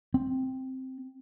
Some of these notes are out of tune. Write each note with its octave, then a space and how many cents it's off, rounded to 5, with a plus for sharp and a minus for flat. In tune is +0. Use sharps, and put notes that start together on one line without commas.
C4 +0